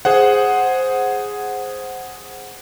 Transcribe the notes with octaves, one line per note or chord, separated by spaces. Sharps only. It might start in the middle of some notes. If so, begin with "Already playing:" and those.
G#4 C5 F#5